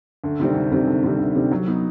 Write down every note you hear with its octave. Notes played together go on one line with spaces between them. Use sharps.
D2
C3 D#3 G3 C4
D2
C3 D#3 G3 C4
D2
C3 D#3 G3 C4
D2
C3 D#3 G3 C4
F#3
B3 D#4